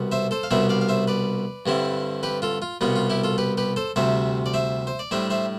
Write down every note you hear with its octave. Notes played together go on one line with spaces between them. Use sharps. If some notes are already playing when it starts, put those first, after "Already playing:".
Already playing: C2 B2 G3 B3
C5 E5
A4 C5
F5
C2 B2 G3 D4 C5 E5
D5 F5
F5
C5 E5
B4 D5
G2 D3 G3 C4 E4
G4 B4
F4 A4
F4
C2 B2 G3 B3 F4
F4
E4 G4
F4 A4
G4 B4
G4 B4
A4 C5
D2 C3 G3 C5 E5
D5
C5 E5
C5
D5
A2 G3 D4 C5 E5
C5 E5